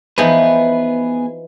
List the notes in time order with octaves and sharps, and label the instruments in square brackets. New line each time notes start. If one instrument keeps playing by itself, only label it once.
[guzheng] E3 F3 D#4 [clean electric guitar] B3 G#4 B4